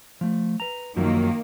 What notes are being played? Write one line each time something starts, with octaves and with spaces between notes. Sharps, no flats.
F3 A3
B4 A#5
F#2 D#3 F3 F#3 A#3